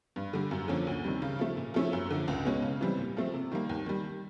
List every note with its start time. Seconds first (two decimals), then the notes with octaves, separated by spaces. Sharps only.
0.16 G2
0.33 D3 G3
0.51 F#2
0.68 D3 F3 A#3 C#4
0.87 D2
1.04 C3 D#3 G3
1.22 C#3
1.39 F3 A3
1.57 A#2
1.74 F3 A3 C#4 E4
1.93 F#2
2.10 D3 F3
2.28 C#2
2.45 B2 G#3 C#4
2.62 C#3
2.81 E3 G3 C4
2.98 A#2
3.17 F3 A3 C4
3.33 C3
3.52 D#3 G3 A#3
3.69 D#2
3.86 D#3 G3